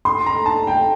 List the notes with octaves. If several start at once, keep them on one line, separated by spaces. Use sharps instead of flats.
C6
A#5
A5
G5